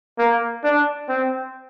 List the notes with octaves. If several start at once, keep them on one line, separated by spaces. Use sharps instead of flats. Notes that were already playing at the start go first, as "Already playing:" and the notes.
A#3
D4
C4